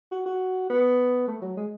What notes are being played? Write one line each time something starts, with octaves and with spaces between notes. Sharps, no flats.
F#4
F#4
B3
A3
F#3
G#3